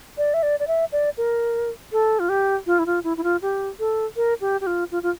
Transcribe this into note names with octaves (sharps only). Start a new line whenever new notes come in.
D5
E5
D5
D5
E5
D5
A#4
A4
F4
G4
F4
E4
F4
E4
E4
F4
G4
A4
A#4
G4
G4
F4
F4
F4